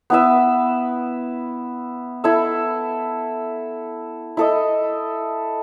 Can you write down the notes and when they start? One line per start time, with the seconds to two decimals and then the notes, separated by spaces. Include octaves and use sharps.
0.10 B3 E4 B4 E5
2.24 E4 A4 E5
4.37 E4 A4 D#5